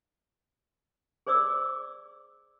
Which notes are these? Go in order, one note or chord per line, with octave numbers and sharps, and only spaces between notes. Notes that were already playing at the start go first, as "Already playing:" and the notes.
G#4 C5 D5 D6 E6